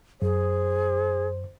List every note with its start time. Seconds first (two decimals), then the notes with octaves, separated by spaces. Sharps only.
0.22 F#2 G#4 C5